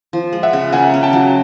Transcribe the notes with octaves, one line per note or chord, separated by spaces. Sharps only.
F3
G#3
E5 F#5
C#3
A#3 F#5 G#5
C#4
G5 A5
F#3